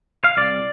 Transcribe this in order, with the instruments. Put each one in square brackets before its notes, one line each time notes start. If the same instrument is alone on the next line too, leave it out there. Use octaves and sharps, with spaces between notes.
[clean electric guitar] F5
C2 D5